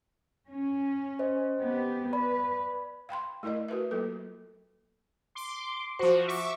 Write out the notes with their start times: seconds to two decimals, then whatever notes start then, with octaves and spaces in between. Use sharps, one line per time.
0.49 C#4
1.19 C5 D#5
1.61 B3 G4
2.13 B4 D5 B5
3.09 F5 G5 B5 C6
3.43 A3 E4 A#4 D5 D#5
3.68 F#4 A#4 B4 E5
3.91 F#3 A#3 F4 A4
5.35 C6 D6
5.99 F3 F#4 C5
6.28 E5 C#6 D6